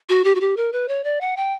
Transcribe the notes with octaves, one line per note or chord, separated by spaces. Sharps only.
F#4
G4
F#4
G4
A#4
B4
C#5
D5
F#5
G5